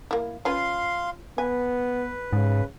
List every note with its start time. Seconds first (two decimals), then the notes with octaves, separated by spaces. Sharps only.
0.11 A#3 E4
0.45 C#4 F4 B4 F5 C6
1.38 B3 B4 G#5
2.33 G#2 C#3